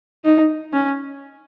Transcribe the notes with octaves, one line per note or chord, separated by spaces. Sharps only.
D#4
C#4